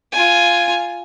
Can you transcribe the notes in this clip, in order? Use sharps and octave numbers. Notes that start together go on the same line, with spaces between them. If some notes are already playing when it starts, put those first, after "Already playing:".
F4 G#5